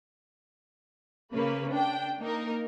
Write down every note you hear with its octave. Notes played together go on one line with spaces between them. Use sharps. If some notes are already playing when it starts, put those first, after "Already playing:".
C#3 A#3 B4
D4 G5
A#3 D#4 A#4